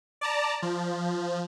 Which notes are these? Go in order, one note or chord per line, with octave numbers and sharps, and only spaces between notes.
D5 A5 A#5
F3